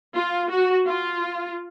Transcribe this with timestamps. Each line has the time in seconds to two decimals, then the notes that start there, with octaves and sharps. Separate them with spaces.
0.16 F4
0.51 F#4
0.87 F4